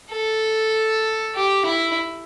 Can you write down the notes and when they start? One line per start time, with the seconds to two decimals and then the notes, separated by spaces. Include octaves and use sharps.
0.12 A4
1.35 G4
1.66 E4